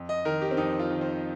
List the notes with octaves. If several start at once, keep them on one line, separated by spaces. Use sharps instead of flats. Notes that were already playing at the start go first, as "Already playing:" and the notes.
Already playing: F2
D#5
D#3 A#4
G4
C4
F2 D#4
F4
D#3
C5